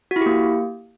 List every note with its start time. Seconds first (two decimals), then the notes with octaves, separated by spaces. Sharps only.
0.11 F#4
0.16 E4
0.21 G4
0.26 A#3